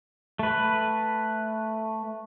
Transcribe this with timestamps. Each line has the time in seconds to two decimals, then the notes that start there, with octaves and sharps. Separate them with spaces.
0.39 A3 B4